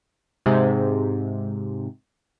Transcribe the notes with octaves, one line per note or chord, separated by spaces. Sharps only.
G#2 C3